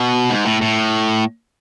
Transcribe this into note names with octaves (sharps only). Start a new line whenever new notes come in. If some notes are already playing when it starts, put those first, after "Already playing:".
Already playing: B2
G#2
A2
A2